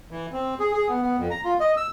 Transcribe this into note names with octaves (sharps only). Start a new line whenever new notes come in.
E3
C4
G#4
G#4
B3
B3
F2
A#5
F4
D#5
E6